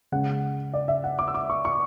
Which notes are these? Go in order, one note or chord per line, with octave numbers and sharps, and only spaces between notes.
C#3 G#3 C#4 F#5
D5
E5
F#5
D6
E6
D6
C#6
C#6